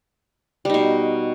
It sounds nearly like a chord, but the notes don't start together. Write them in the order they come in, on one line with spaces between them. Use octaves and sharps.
G3 D#4 B2